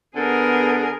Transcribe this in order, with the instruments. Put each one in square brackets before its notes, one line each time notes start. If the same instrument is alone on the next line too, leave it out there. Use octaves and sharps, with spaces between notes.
[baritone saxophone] D3 [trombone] B3 [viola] G#4 A#4